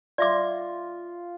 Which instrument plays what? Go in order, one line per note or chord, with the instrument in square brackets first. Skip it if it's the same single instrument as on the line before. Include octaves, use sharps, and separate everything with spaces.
[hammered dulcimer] F4 [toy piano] D5 E5 D6